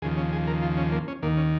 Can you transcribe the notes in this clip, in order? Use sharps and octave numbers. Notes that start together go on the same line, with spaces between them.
D#2 C#3 F3 G#4
C#4
G#4
A#4
F4
C#4
A#3
C#4
D#2 D#3 A#3
C#4